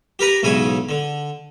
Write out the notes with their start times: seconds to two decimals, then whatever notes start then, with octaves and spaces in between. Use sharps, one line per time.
0.19 G4 A#4 B4 A#5
0.43 B1 G#2 C#3 E4 G#5
0.89 D3